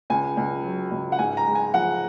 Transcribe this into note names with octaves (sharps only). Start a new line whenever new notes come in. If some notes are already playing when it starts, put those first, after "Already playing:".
C#2 G#5
C#2
F#3
C#2
F#5
G#2 G#5
A#5
G#3
G#5
F3 F#5